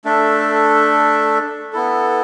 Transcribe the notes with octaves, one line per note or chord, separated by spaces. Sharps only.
A3 D4 A4 E5
B3 E4 A4